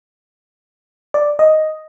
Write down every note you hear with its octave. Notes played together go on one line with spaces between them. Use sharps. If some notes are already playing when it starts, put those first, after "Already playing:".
D5
D#5